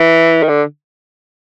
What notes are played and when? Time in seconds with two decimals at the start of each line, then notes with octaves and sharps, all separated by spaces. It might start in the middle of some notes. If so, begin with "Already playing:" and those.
Already playing: E3
0.43 D#3
0.48 D3